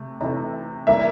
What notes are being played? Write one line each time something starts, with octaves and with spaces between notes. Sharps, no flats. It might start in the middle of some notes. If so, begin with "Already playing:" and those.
Already playing: C3 A3
C3 E3 A3
E3 G3 A#3 E5